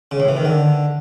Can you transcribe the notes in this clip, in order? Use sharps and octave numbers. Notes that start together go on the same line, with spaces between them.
C#3
A2
E3
D#3
D3